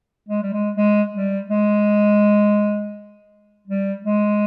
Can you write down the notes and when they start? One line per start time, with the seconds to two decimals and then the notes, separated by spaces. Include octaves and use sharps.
0.29 G#3
0.42 G3
0.53 G#3
0.77 G#3
1.14 G3
1.50 G#3
3.68 G3
4.05 G#3